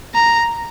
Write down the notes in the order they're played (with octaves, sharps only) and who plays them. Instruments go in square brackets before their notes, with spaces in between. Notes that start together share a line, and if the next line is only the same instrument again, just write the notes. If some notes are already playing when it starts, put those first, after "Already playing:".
[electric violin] A#5